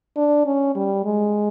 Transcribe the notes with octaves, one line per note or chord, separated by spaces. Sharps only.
D4
C#4
G3
G#3